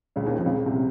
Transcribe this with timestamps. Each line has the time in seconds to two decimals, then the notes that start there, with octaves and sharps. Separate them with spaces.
0.16 C#2 C#3
0.27 D#2 D#3
0.36 F2 F3
0.46 C#2 C#3
0.66 C2 C3